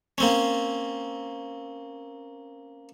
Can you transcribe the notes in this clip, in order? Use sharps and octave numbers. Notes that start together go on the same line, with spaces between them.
A#3 C4 C#4